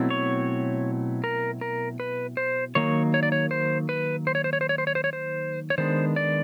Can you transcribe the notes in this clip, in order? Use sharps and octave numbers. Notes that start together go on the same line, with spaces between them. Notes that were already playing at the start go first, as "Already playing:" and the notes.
Already playing: B2 F#3 A3 C4 E4
C#5
A#4
A#4
B4
C5
D#3 F#3 A#3 D#4 C#5
C#5
D5
C#5
C5
B4
C5
C#5
C5
C#5
C5
C#5
C5
C#5
C5
C#5
C5
C#5
D#3 G#3 B3 D4 C5
D5